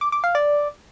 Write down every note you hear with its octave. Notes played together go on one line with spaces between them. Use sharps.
D6
D6
F5
D5